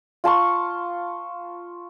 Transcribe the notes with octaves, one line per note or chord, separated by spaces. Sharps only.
F4 A5 C6 C#6